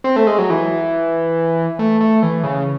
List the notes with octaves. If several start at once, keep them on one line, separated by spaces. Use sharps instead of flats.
C4
A3
G#3
F#3
E3
A3
A3
E3
C#3